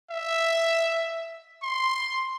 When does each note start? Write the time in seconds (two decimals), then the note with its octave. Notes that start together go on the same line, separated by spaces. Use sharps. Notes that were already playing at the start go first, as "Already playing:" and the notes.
0.11 E5
1.63 C6